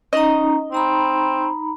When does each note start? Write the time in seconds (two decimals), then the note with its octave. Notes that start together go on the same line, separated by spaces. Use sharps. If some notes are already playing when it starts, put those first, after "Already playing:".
0.13 C#4 D#4 D#5 A#5
0.72 C4 D#4 A#5 B5